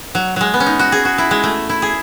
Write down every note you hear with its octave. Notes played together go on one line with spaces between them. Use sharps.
F#3
F#3 G#3
B3
C#4
D#4
F#4
G#4
F#4
E4
G#3
A3
E4
G#4